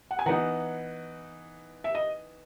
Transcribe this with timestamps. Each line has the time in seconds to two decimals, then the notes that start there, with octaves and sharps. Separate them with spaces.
0.11 F#5
0.19 G#5
0.26 E3 B3 D#4 F#5 A#5
1.84 E5
1.95 D#5